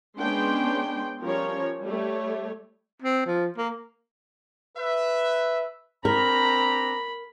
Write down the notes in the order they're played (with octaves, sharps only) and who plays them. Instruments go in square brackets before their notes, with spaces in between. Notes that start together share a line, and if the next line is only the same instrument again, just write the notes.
[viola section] G#3 B3 C#4 D4 G5 C6
F3 G3 C#4 A#4 C#5
G3 A3 C#5
[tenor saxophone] C4
F3
A#3
[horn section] B4 E5
[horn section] C4 D4 A#5 [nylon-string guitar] A#4 [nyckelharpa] B5